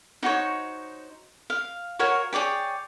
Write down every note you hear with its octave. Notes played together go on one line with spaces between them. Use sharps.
D#4 F#4 C5 C#5
F5
F#4 A#4 C#5 F5
G#4 C#5 D5 G5